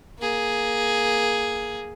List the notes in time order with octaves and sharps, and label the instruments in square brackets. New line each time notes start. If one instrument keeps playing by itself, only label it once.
[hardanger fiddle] A#3 G#4